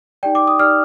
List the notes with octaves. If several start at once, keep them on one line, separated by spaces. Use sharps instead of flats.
D#4 G4 D5 G5
D6
D#6
D#4 G4 D5 F6